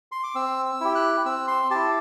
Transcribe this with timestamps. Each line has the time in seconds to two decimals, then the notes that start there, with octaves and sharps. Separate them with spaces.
0.12 C6
0.23 D6
0.35 C4 E6
0.66 E6
0.81 E4 G4
0.95 F#6
1.25 C4 E6
1.48 C6
1.71 E4 G4 A5